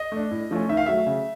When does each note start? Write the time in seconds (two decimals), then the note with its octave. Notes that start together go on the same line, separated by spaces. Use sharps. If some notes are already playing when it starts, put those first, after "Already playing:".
Already playing: D#5
0.12 A3 D4
0.31 A2
0.51 F3 A3 C#4
0.69 D#3 E5
0.77 F5
0.86 F#3 A3 E5
1.07 C#3